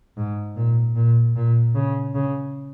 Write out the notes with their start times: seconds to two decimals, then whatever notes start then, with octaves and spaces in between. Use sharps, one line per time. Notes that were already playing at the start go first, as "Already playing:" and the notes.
0.17 G#2
0.56 A#2
0.95 A#2
1.36 A#2
1.75 C#3
2.15 C#3